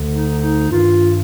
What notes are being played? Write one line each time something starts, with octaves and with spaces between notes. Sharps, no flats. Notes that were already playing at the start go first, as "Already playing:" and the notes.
Already playing: D2 D3
D#4
D#4
G2 D#3 F4